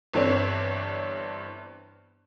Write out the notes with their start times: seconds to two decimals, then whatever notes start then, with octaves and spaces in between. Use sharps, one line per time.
0.13 G1 G2 E3 C4 D4 C#5